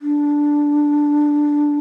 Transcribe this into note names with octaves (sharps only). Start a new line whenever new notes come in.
D4